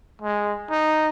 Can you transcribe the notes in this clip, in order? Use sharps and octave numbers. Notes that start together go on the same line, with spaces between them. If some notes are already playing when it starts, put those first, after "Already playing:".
G#3
D#4